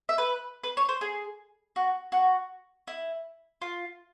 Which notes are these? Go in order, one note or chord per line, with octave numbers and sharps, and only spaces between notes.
E5
B4
B4
C#5
C5
G#4
F#4
F#4
E4
F4